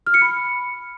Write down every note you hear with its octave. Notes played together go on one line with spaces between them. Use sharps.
F6
C#7
B5